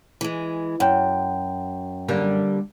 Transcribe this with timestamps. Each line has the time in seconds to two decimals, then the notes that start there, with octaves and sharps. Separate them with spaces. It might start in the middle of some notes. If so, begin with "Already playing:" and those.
0.21 E3 G#3
0.80 F#2 F#5 G5
2.08 D3 G3 A#3